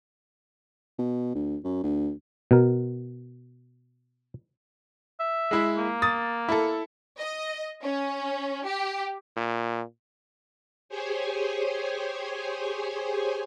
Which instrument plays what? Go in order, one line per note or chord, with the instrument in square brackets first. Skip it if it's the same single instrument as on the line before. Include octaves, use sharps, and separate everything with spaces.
[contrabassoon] B2
D2
F#2
D2
[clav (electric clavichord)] B2 A#4
[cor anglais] E5
[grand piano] G#3 E4
[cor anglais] A#3
[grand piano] D#6 A6
E4 A4
[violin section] D#5
C#4
G4
[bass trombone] A#2
[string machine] G4 G#4 C5 C#5 G#5